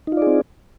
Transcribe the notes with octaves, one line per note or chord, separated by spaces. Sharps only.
C4 D#4 F4 G#4 D5